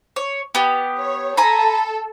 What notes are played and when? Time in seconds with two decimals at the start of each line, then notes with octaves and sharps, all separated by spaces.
0.16 C#5
0.55 B3 G4
0.98 C#5
1.37 A4 G#5 A#5 B5